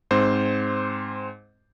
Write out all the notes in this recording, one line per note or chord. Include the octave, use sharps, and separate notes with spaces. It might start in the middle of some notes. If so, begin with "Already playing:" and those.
G#2 C4 C5